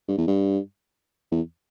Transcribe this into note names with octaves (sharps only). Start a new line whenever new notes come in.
G2
E2
G2
E2